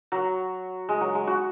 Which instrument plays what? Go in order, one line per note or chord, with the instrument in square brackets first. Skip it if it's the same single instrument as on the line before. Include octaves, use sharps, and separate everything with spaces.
[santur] F#3
G#3
F#3
G#3
F#4